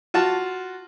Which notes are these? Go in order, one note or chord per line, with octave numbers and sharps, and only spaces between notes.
F4 F#4 A5